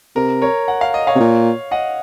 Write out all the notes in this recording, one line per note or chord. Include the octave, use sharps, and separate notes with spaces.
C3 A#4
A#4 C#5
F#5
F5
D#5
C#5 F5
C3
A#2
D#5 F#5